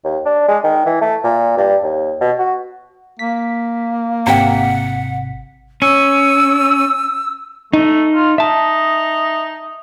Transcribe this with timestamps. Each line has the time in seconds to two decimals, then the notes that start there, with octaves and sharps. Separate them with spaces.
0.04 D#2
0.25 D4
0.48 G#3
0.64 D#3
0.86 E3
1.01 A3
1.24 A#2
1.57 G2
1.83 D#2
2.21 B2
2.39 F#4
3.19 A#3 B6
4.27 G#1 C3 F#5 G5 A#5 B6
5.82 C#4 E6
7.73 A3 D#4
8.15 F4
8.38 D#4 E5 A5